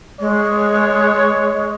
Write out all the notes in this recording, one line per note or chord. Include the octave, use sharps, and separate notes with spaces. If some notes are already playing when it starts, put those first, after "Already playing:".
G#3 C#5